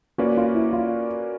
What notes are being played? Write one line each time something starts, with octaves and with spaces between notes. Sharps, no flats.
A#3 C#4 F4 F#4 B4 D5
F4
E4
F4